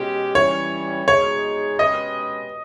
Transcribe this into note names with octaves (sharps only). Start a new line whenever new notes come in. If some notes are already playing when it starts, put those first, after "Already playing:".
Already playing: B2 G#3 C#4 G4
E3 G3 C#4 C#5
B2 G#3 D#4 G#4 C#5
B2 G#3 C#4 G4 B4 D#5